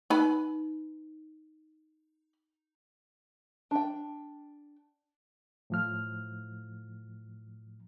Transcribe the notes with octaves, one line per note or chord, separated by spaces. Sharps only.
D#4 B4 B5
D4 G5
A2 F3 F6